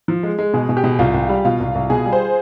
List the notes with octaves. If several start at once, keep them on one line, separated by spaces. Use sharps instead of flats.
F3
G#3
G#3
B2 G#4
B2
G4
B2
C2 F4
C2
G3
B2 F4
C2
C2
B2 G#4
G3
C5